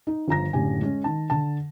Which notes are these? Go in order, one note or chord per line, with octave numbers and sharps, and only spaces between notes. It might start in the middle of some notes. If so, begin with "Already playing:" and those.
D#4
G1 F3 A#5 A#6
F#1 A2 D3 G4 G#5
G#3 C#4
D#3 A5
D3 A5